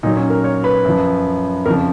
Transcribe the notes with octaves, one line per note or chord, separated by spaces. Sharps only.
A#2 F#3 D#4
C#4
A#4
C#5
B4
F#2 F3
F2 C#3 F3 A#4